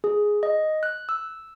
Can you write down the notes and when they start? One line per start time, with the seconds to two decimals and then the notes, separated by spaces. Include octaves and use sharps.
0.04 G#4
0.43 D#5
0.83 F#6
1.09 E6